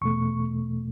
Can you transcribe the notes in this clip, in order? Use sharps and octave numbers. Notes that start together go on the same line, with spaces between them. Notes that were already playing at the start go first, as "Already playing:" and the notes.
E2 B2 A3 C#6